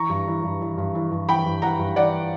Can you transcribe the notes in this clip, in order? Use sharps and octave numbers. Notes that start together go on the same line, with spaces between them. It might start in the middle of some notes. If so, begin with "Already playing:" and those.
Already playing: E3 A#5 C#6
G2
E3
G2
E3
G2
E3
G2
E3 G5 B5
G2
E3 F#5 A#5
G2
E3 D5 F#5